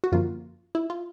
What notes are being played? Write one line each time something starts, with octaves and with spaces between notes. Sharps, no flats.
F#4
F#2 D3 F3 A#3 F4
E4
F4